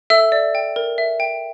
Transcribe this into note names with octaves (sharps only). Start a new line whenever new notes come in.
A4 E5 E6
D5
G5
A#4
E5
G5